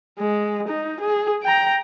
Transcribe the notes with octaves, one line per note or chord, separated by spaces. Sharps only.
G#3
D#4
G#4
G5 A#5